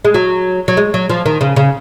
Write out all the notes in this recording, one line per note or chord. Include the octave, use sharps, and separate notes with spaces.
G#3
F#3
F#3
G#3
F#3
F3
D#3
C#3
C#3